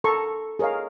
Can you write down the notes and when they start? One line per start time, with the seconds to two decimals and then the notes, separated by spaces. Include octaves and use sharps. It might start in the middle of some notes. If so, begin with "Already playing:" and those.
0.04 A4 A#4 A#5 C6 C#6
0.59 G#4 A#4 C#5 D#5 F5